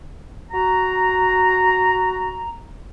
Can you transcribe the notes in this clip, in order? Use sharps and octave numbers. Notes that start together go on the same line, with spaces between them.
F#4 A#5